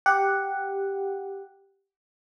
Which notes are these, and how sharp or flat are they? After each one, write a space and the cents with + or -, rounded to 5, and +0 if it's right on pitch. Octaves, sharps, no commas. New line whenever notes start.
G4 +0 F#5 +0